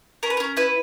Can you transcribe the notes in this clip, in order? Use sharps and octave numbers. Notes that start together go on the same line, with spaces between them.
C#4 A#4
B4
C#4 A#4
E4 B4